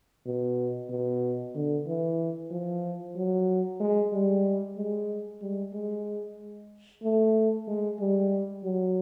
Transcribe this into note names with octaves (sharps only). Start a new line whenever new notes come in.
B2
B2
D3
E3
F3
F#3
G#3
G3
G#3
G3
G#3
A3
G#3
G3
F#3